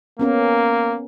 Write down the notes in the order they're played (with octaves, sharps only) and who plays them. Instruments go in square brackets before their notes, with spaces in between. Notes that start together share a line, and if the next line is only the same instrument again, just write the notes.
[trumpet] A#3 [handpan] B3 C#4 A#4